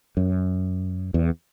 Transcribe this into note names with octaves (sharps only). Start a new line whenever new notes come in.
F#2
E2